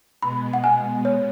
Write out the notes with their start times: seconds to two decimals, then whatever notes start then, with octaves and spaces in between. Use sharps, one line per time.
0.21 B2 G#3 B3 B5
0.53 F#5
0.64 G#5
1.05 C#5